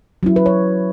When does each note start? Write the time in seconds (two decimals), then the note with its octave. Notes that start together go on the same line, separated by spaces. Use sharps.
0.23 F#3 C#4 E4
0.36 B4
0.46 C#5